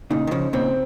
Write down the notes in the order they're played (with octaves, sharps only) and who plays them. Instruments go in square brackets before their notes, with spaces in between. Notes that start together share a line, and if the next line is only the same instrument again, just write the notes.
[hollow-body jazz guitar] A#2 C#3 [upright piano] D#4
[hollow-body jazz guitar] D#3
C#3 F3
[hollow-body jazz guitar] A#2 C#3 [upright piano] C4